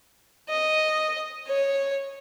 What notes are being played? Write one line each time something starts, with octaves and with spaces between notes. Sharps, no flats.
D#5
C#5